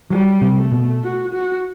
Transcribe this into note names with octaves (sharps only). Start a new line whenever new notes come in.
F#3 G3
C3
A3
B2
F#4
F#4